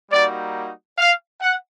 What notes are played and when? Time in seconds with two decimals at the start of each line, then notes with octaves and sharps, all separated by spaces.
0.11 G3 A#3 D#4 F#4 D5
0.98 F5
1.41 F#5